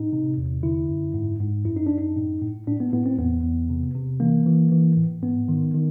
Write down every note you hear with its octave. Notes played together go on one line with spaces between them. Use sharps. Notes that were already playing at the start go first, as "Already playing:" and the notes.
Already playing: A2 D#4
C3
E2
D3 E4
F#2
G#2
G#2
F#2 E4
D#4
F#2 D4
D#4
A2
A2
A2 D4
B3
A2 B3
C4
E2 B3
E2
C3
C3
E3 A#3
E3
E3
A2
G#2 B3
D#3
D#3